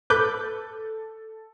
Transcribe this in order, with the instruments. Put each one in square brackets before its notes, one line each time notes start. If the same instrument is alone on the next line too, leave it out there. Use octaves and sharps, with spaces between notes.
[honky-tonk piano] A4 [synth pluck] B4 D6 G6